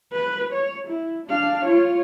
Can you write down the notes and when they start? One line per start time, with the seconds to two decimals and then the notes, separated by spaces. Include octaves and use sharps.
0.13 B4
0.53 C#5
0.88 E4
1.27 D4 F5
1.65 F4 C#5